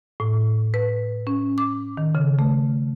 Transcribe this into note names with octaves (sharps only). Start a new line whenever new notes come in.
A2
B4
C#4
D6
D#3
C#3
A3